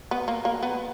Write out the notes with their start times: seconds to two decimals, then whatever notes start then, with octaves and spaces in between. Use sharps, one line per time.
0.11 B3
0.28 A#3
0.45 A#3
0.63 B3